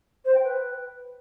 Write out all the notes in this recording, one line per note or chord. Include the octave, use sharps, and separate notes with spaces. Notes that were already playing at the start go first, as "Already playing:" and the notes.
C5
G5
B4